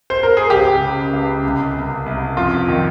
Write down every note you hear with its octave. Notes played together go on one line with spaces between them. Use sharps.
C5
A#4
G#4
C#2 G4
C#3
C#2
C2
C2
C2
F2 F4
D#3